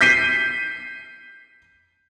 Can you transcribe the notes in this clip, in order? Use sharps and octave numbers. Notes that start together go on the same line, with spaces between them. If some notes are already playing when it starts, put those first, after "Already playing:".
G6 B6 C7 D#7